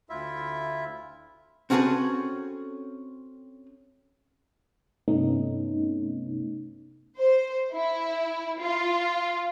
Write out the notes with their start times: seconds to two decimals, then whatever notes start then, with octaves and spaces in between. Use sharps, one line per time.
0.09 D2 E4 F4 E5
1.70 C4 C#4 F#4 G#4 A4 B4
5.08 G2 C3 A3 B3 C#4 D#4
7.17 C5
7.74 E4
8.60 F4